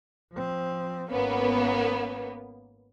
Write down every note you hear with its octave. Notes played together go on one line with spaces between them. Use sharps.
F3 C4
G#1 A#3 B3 C#4